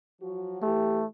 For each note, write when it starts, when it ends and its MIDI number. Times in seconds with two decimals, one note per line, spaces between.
0.20 0.59 53
0.20 0.59 54
0.20 0.59 66
0.62 1.02 52
0.62 1.06 57
0.62 1.02 67